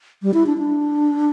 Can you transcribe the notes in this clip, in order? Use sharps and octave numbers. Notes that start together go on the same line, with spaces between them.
G3
E4
D4
D4